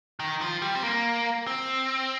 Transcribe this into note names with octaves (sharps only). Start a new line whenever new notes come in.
D#3
F3
G3
C4
A#3
C4